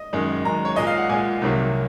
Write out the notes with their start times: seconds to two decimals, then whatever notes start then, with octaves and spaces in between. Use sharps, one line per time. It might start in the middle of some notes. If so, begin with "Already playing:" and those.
Already playing: D#5
0.13 F#2 D#3 G#3
0.45 F#2 D#3 G#3 A#5
0.65 C#5
0.76 A#2 G#3 D#5
0.87 F5
0.98 F#5
1.09 A#2 G#3 G#5
1.42 C2 C3 D#3 F#3 A#3